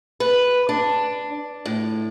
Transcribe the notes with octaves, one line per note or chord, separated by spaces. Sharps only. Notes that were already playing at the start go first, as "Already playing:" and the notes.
B4
D4
A2